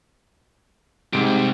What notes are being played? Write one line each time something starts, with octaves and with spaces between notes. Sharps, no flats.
G#2 C3 G3 D7